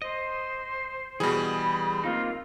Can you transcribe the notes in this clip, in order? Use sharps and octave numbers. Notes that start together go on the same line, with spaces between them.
C5 D#5
B2 E3 G3 G#4 B5
A#3 C4 D#4 F4